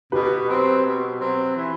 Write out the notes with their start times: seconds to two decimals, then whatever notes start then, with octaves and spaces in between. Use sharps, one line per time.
0.12 B2 G4 B4
0.48 F#3 C4
0.84 B2
1.20 F#3 C4
1.55 E3